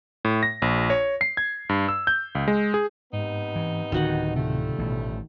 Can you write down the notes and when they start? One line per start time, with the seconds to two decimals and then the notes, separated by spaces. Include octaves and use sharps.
0.25 A2
0.43 A#6
0.62 A#1
0.90 C#5
1.21 C7
1.37 G#6
1.69 G2
1.89 E6
2.07 G6
2.35 C#2
2.48 G#3
2.74 G#4
3.13 G#2 C3 B3 D#4
3.55 E3
3.92 D1 D3 D#3 F#4 F#5
4.36 C3 F3 G3 A3
4.79 A1 B2 E3